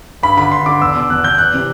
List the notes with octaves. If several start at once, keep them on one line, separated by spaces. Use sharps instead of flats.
G2 B5
D3 B5
G2 C6
D3 D6
E2 E6
B2
E2 F#6
B2 G6
E2 F#6
C3 E3